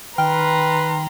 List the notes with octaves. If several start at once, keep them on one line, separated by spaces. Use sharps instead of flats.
D#3 B4 G5 A#5 C6 F6